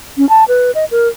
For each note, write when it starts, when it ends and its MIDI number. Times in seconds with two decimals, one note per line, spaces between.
0.18 0.28 61
0.29 0.44 81
0.48 0.71 71
0.75 0.85 75
0.91 1.08 70